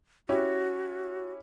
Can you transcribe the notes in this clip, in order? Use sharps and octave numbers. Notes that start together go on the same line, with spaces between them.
C#4 E4 F#4 G4